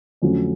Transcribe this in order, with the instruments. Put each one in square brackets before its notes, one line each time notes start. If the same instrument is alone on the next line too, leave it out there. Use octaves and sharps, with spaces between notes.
[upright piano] F2 D3 F#3 A3 C#4